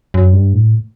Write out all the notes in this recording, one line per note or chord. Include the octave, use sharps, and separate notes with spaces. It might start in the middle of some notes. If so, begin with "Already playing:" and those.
F#2
G2
A2